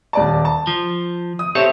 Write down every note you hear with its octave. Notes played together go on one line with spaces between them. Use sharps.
D#1 D5 A5
A5
F3
D#6
C4 G4 A4 C#5 E5